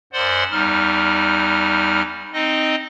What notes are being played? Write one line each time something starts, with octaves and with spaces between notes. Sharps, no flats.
F#2 C5 D5 F#5 C6
E2 G3 D#4 F6
C4 D#4 D#5